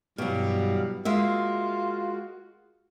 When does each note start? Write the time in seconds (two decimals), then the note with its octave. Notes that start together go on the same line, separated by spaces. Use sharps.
0.18 G2 B2 E3 F#3 G3 F5
1.05 G#3 A#3 F4 F#4 E5